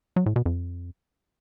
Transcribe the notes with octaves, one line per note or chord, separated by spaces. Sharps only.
F#3
A2
B2
F2